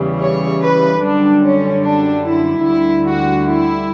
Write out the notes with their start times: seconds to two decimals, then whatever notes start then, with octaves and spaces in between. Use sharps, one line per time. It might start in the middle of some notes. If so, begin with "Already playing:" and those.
Already playing: E2 C#3 E3 G3
0.20 C#5
0.61 B4
1.01 F#2 D3 G3 D4
1.43 C#4
1.83 D4
2.24 E4
2.64 D2 D3 G3 E4
3.06 F#4
3.46 E4